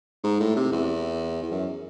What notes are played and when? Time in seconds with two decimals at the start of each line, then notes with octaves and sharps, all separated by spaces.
0.24 G#2
0.40 A2
0.56 C3
0.72 E2
1.42 E2
1.51 F#2